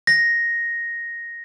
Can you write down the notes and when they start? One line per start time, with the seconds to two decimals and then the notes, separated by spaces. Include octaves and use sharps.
0.07 A#6